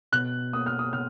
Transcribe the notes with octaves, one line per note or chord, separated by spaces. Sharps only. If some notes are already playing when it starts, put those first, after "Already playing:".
B2 F#6
A#3 D#6
F6
D#6
B2 F6